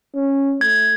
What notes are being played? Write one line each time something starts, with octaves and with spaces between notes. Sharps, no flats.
C#4
A3 G#6